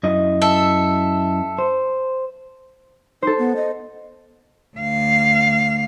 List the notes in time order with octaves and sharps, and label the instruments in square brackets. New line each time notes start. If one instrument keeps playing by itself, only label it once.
[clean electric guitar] F#2 E4 D#5
[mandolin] A4 E5
[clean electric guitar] C5
[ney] D#4 [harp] A4 C5
[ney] B3
D#5
[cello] D2 F5